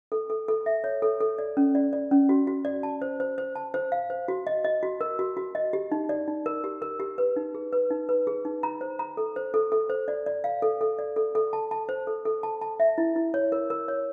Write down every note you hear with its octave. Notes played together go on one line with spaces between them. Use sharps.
A4
A4
A4
E5
C#5
A4
A4
D5
C#4
D5
D5
C#4
F#4
F#4
D5
A5
C5
C5
C5
A5
C5
F5
C5
F#4
D#5
D#5
F#4
A#4
F#4
F#4
D#5
G4
D#4
D5
D#4
A#4
G4
A#4
G4
B4
D#4
G#4
B4
D#4
B4
G#4
D#4
A#5
C5
A#5
A4
C5
A4
A4
C5
D5
D5
F5
A4
A4
D5
A4
A4
A5
A5
C5
A4
A4
A5
A5
E5
E4
E4
C#5
A#4
A#4
C#5